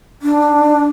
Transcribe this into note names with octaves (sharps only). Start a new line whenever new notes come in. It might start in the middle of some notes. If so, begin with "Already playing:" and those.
D4